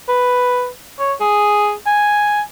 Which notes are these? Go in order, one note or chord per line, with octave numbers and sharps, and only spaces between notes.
B4
C#5
G#4
G#5